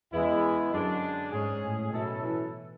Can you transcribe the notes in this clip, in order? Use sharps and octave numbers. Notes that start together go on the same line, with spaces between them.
E2 C#3 G#3 B3 E4
F#2 D3 G#3 D4
G#2 G#3 C#4 G#4
A2
B2 F#3 C#4 E4 A4
E3